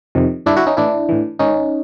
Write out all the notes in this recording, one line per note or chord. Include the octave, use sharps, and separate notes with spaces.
F2 C3 D#3
G2 D3 D4 E4
E4 F#4
C#4 D#4
A2 E3 D4 E4
A2 E3
G#2 D#3 C#4 D#4